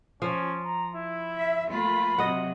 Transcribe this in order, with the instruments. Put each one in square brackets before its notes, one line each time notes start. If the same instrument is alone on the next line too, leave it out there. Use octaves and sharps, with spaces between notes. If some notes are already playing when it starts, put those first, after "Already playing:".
[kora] F3 [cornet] C#4
[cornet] A#5
E4
[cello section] E5
[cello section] A3 A#3 F4 [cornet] B5
[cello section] C3 F#3 [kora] D#5 F#5